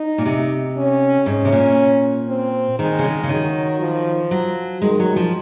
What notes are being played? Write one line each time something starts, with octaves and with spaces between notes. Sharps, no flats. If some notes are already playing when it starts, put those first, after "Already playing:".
Already playing: D#4
A#2
C3
C#4
G#2 C#4
C3
A#2
C4
D#3 G#3
C#3
D#3
C#3
D#3 F#3
F3
F#3
D#3 G#3
F#3
F3